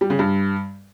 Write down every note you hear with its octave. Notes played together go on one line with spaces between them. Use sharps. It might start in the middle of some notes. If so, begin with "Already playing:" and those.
G3
C#3
G2